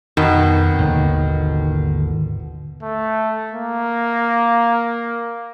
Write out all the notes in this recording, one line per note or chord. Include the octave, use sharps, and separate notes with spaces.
F2 B2 D#3
G#1 D#2 D3 A#3
A3
A#3